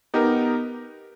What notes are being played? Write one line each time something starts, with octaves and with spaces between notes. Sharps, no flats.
B3 D#4 G4 A#4